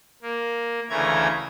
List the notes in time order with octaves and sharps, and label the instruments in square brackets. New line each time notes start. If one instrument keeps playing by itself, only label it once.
[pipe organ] A#3
D2 C#3 E3 A3 A#5 G#6